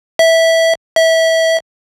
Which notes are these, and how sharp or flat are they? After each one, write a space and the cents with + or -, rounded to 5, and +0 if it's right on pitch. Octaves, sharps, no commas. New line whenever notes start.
E5 -10
E5 -20